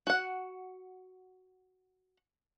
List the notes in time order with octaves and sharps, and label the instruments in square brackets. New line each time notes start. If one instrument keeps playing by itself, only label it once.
[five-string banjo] F#4 F#5